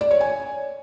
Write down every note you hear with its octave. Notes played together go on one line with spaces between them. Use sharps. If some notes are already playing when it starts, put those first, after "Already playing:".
D5
C#5
G#5